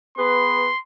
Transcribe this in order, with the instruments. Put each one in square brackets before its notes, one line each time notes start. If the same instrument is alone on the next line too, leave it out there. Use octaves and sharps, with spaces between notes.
[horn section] B3 G#4 B4 [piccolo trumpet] C6